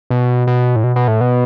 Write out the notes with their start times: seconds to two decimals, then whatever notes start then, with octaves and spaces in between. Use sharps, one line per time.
0.10 B2
0.47 B2
0.76 A2
0.84 B2
0.96 B2
1.08 A2
1.21 B2